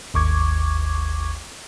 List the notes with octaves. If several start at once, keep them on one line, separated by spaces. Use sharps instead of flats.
G#1 D#2 C#6 D6 G#6